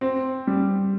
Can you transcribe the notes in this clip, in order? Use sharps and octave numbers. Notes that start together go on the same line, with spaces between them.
C4
G3